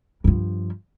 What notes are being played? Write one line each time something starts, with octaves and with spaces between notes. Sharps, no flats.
G2 F3